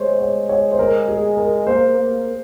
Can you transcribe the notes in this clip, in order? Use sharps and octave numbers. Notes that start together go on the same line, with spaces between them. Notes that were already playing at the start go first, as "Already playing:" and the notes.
Already playing: G#3 C5 C#5
C#5
C#5
C5
A#4
G#4
A#4
A#3 C5
A#3